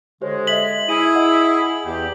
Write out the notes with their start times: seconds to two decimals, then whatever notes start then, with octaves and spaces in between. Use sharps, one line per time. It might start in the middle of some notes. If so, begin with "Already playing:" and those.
0.22 D3 G#3 G4 C5 C#5
0.47 D#5 E5 B6 F#7
0.89 E4 G#4 D#7
1.15 D#5 F#5
1.85 E2 G4